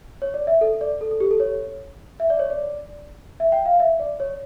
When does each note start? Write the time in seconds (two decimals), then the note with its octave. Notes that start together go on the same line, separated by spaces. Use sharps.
0.22 C#5
0.34 D5
0.47 E5
0.61 A4
0.81 D5
1.01 A4
1.11 A4
1.20 G4
1.31 A4
1.40 C#5
2.20 E5
2.30 D5
2.39 C#5
2.50 D5
3.40 E5
3.52 G5
3.66 F5
3.80 E5
4.00 D5
4.20 C#5